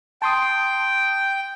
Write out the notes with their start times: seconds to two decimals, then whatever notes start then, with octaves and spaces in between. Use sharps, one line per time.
0.22 G5 A5 C6 D#6